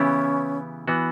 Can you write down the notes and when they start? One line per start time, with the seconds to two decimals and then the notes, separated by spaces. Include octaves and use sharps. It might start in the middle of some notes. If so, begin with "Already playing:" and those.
Already playing: C#3 E3 B3 C#4 E4 G4
0.88 E3 B3 F#4